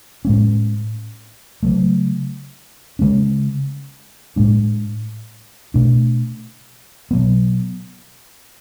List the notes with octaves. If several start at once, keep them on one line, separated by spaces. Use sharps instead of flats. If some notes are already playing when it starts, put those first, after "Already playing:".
A2 G#3 C#4
C#3 F#3 A3
C#3 G#3 C#4
A2 G#3 D4
B2 A3 D4
B2 F#3 B3